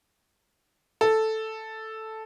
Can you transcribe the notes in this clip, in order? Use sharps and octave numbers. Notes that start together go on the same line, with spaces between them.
A4